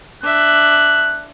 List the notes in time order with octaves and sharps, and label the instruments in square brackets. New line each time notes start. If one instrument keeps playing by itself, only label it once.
[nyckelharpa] D4 E5 [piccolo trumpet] F#6